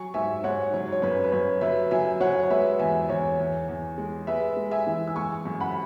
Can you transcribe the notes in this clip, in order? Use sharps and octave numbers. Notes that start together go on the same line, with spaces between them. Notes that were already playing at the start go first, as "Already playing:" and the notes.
Already playing: F#3 G#5 C#6
G#2 E5 G#5
G#2 C#5 F#5
F#3 C#5
C#5
F#2 B4
B4
F#2 C#5
F#3 B4 E5
F#3 E5 G#5
F#3 C#5 F#5
C#5
G#3 B4 E5
E2 E5 G#5
E2 C#5
E2
E2
G#3
G#3 B4 E5
G#3
E5 G#5
E3
E6
G#3 G#5 C#6
F#2
F#5 B5